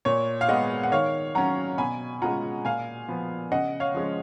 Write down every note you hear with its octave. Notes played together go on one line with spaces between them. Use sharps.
A#2 C#5
F5
G#3 B3 D#5 F#5
F#5
D#3 C#5 F5
F#3 C#4 F#5 A#5
B2 G#5 B5
G#3 C#4 F4 F#5 A#5
A#2 F5 G#5
F3 B3
C#3 D#5 F#5
C#5 F5
F3 G#3 C#4